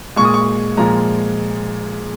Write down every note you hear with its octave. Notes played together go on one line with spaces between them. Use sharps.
A#2 G#3 C#6
D#6
C#6
A#2 F3 G#3 A#5